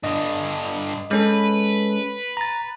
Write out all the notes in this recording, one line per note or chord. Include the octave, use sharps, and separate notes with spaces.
G2 D3 D#5
G#3 C#4 A4 B4
A#5 A6